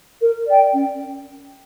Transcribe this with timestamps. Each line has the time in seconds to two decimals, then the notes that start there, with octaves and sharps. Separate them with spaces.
0.20 A#4
0.47 D5 G5
0.73 C#4